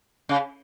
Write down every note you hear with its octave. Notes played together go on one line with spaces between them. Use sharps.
C#3